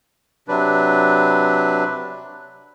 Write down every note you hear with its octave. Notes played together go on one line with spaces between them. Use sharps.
C3 F#3 D4 B4